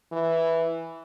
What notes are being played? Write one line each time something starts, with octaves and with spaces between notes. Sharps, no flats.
E3